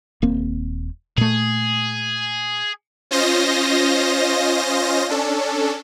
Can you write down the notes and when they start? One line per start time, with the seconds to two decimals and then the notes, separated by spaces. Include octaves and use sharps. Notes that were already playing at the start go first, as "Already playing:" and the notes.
0.22 D#1 A#3 C4
1.18 A#2 A3 G#4
3.11 C#4 F4 C5 D#5 A#6
5.09 C#4 D4 A4